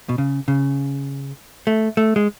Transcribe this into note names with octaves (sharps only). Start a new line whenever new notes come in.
B2
C#3
C#3
A3
A3
G#3